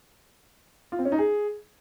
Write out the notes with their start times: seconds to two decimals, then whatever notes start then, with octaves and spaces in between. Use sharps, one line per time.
0.92 F4
0.99 C4
1.05 C#4
1.12 D#4
1.19 G#4